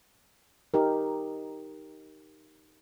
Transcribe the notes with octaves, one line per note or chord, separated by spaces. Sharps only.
D#4 G4 A#4